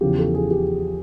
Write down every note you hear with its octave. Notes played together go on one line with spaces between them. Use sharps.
E2 C#3 F3 G4
A4
G#4
G4